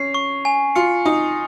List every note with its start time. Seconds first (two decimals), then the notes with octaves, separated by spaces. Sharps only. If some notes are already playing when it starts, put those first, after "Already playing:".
Already playing: C#4 C7
0.14 C#6
0.45 G#5
0.75 F4 C#7
1.05 D#4 D#6